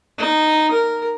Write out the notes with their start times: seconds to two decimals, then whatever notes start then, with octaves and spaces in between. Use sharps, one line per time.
0.18 D#4
0.71 A#4